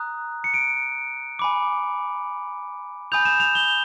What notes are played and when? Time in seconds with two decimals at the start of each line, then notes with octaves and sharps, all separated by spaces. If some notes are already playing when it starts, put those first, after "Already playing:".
Already playing: A#5 D#6 F#6
0.44 C#7
0.54 D7
1.39 G#5 B5 D6
3.12 G#5 B5 D#6 G6 F7
3.25 E7
3.40 F7
3.55 G7